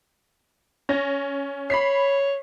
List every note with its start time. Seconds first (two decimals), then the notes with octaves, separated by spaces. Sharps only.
0.89 C#4 A#6
1.70 C#5 B5 B6 C7